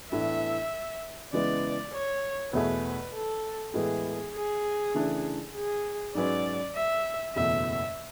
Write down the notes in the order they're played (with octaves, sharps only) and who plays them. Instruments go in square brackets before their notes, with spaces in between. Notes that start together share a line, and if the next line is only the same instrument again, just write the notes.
[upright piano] A2 E3 B3 D4 [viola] E5
[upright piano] C#3 E3 G#3 B3 [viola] D5
[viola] C#5
[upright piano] E2 B2 A3 E4 G#4 [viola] B4
[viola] A4
[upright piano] A2 E3 G#3 B3 [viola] G#4
[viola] G#4
[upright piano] C#3 E3 A3 D4 A4
[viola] G#4
[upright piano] G#2 F#3 C#4 G#4 B4 [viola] D5
[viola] E5
[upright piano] F#1 E2 B2 A3 E4 [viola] E5